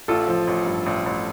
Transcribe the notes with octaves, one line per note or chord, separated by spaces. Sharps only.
A1 F4 A4
F3
A1
G2
A1
A1